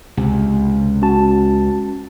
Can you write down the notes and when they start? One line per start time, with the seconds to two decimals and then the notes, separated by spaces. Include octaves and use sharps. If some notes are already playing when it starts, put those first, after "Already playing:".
0.17 C#2 C3
1.02 C#4 F#4 A5